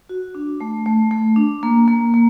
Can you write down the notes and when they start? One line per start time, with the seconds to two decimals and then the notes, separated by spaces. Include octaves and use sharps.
0.09 F#4
0.35 D4
0.61 A3
0.86 A3
1.11 A3
1.36 D4
1.63 A#3
1.88 A#3
2.14 A#3